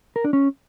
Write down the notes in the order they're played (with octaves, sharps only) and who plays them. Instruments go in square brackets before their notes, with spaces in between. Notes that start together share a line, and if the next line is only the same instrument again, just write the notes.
[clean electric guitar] A#4
D4
C#4